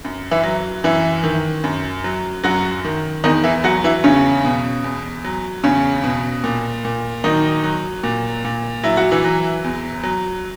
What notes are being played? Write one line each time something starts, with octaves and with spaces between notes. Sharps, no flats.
F#2
E3 E4
F#3
F#2 E3 E4
D#3
F#2
F#3
F#2 F#3 F#4
D#3
E2 D#3 D#4
E3 E4
F#3 F#4
E3 E4
E2 C#3 C#4
B2
E2
F#3
E2 C#3 C#4
B2
A#2
A#2
D#3 F#3 D#4
F#3
A#2
A#2
F#3 E4
F#4
E3 E4
F#3
E2
F#3